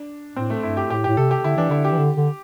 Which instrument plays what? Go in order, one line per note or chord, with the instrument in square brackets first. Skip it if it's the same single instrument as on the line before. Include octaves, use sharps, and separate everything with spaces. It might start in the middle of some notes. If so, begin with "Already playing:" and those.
Already playing: [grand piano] D4
[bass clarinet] A2 [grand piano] C4
[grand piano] A3
[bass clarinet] G2 [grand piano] E4
[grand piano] G4
[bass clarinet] A2 [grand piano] G4
[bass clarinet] A2 [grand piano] G4
[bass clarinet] C3 [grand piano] A4
[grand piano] G4
[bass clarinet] D3 [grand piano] E4
[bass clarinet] E3 [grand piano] D4
[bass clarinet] D3 [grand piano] E4
[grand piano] G4
[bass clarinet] E3
D3
D3